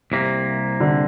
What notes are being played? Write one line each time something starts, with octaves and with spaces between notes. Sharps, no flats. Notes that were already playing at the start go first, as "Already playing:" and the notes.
C2 C3 A#3
D3